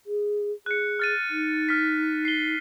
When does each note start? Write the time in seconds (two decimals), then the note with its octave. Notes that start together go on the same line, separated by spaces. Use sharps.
0.06 G#4
0.66 G#4 F#6 C#7
0.99 F6 A6 D#7
1.30 D#4
1.69 F6 B6
2.25 C7 G7